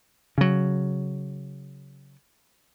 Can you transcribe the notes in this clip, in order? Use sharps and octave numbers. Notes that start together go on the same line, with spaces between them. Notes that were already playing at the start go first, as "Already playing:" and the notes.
C#3 F#3